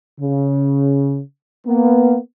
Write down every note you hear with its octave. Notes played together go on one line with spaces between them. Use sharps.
C#3
A#3 B3